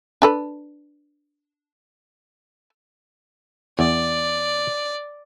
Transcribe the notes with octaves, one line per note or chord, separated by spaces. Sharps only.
D4 A4 B4
E2 D5